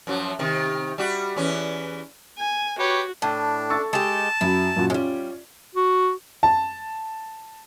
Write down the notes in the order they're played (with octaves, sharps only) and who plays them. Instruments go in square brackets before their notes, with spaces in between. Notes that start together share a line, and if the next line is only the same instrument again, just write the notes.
[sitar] F#2 F3 F#3
C3 D#3
G3 F#4
E2 E3 C#4
[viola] G#5
[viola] F#4 [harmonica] G4 B4 C#5
[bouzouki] A2 [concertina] D4
[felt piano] C#6 E6 A6
[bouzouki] G#3 G4 [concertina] A5
[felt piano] F#2 F#3 [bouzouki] E4
[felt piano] F#2 A#2 F#4
[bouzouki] G3 G#3 [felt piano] C#4 F4
[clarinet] F#4
[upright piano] A5